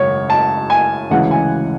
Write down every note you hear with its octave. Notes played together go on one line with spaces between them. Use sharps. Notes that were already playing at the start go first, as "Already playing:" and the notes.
Already playing: G#1 F#2 C#3 C#5
A5
G#5
D2 C#3 E3 G#3 F#5
G#5